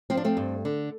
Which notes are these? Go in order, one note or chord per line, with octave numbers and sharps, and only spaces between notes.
F3 C4
D4
A3 C4
G2
D3